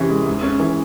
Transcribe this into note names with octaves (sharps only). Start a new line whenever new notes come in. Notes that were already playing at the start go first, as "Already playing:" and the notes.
Already playing: C3 E3 C#4
G#3
G#2
C#4
E3